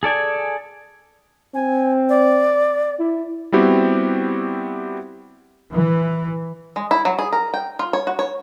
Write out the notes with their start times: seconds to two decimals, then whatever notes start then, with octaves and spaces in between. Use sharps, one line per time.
0.03 G#4 A4 D5 G#5
1.54 C4 G#5
2.09 D5
2.99 E4
3.52 G3 B3 C4 E4 F#4 G4
5.72 E3
6.76 G#3
6.91 E4
7.05 F#3
7.19 G#4
7.33 A#4
7.54 G5
7.79 F4
7.93 C#5
8.07 F#4
8.19 C#5